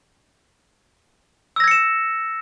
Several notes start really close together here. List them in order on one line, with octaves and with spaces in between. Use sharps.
E6 A#6 G#6 C#7 E7